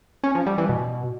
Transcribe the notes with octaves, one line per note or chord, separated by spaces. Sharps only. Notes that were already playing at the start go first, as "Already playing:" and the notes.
C#4
F3
G3
E3
B2